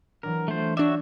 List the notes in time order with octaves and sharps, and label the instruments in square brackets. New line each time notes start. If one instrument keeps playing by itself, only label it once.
[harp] E3 F#3 D4 [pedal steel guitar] A#4
[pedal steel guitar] A3 C5 [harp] F4 A6
[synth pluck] D4 D5 [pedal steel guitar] F#4 C#5 E5